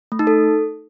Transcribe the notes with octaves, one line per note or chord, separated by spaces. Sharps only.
A3
D#4
A4